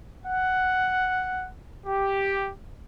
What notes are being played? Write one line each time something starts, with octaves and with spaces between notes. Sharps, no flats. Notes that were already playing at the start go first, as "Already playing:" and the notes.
F#5
G4